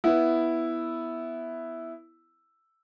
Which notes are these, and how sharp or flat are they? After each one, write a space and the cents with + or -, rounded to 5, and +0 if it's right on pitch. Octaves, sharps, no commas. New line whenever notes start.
B3 +0 E4 +0